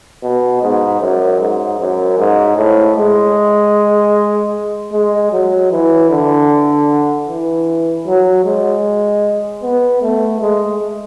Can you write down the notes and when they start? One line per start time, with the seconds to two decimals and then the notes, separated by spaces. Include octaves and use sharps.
0.23 B2
0.62 G#2
1.00 F#2
1.40 G#2
1.79 F#2
2.18 G#2
2.57 A2
2.97 G#3
4.93 G#3
5.32 F#3
5.71 E3
6.10 D3
7.27 E3
8.07 F#3
8.45 G#3
9.62 B3
10.02 A3
10.41 G#3